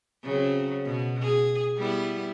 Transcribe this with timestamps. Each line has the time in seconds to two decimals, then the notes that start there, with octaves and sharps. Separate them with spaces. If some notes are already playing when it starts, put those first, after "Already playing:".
0.23 C#3 F#3 C4
0.84 B2
1.22 G#4
1.78 G3 B3 E4